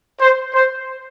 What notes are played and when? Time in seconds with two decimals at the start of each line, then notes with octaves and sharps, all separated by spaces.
0.20 C5
0.54 C5